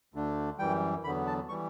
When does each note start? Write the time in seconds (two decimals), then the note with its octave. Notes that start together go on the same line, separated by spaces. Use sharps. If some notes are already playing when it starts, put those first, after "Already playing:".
0.14 D2 D3 A3 D4
0.59 F#2 E3 G3 G5
1.04 E2 D3 F#3 B3 B5
1.27 A5
1.49 E3 G3 C#6